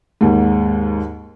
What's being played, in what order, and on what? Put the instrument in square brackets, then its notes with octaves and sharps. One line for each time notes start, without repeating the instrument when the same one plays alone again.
[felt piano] D#2 G#2